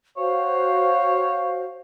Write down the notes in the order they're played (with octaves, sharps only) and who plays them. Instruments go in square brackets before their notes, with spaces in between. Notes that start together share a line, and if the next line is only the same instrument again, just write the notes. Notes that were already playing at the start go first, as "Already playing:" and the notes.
[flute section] F#4 C5 F5 [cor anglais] C#5